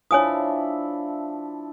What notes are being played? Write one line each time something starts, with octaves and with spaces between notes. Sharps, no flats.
F3 D4 E4 C#5 G#5 D#6